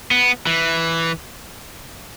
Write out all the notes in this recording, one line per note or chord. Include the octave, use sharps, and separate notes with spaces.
B3
E3